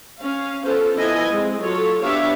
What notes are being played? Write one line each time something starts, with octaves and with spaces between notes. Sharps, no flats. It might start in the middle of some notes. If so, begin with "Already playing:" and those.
C#4 F5
B3 C#4 F4 A4 C5
F3 B3 E4 D#5 G#5
G#3 C4
F#3 F4 A4 C#5
B3 D4 G4 C#5 E5 F5